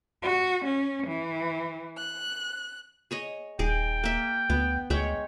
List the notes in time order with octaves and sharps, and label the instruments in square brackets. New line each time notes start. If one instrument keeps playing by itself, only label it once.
[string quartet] F#4
C#4
E3
F#6
[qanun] G#4 C#5 D#5
[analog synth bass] D#1 [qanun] D#4 G#4 D6 [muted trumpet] G5
[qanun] A#3 E5
[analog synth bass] D2 [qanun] B3
[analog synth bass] D2 [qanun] G#3 E5 G5 [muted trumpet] C#5